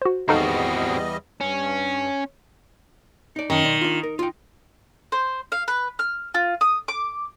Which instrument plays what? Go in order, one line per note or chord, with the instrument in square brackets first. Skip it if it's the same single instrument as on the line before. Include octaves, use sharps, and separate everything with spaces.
[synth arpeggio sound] F#4 C5
[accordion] E2 G3 D#5 [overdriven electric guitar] C4 F#4 [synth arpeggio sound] D#4 A4 F5
[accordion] G2 [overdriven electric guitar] C#4
[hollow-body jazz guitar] D#4 D5
[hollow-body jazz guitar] F#2 C#4 A5 [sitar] D#3
[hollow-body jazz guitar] B1 D5 C6
D4 F4
A#4
F4 G5
[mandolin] C5
F5
B4
F6
F4
D#6
D6